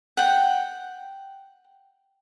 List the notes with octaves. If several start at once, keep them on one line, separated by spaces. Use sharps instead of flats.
F#5 G5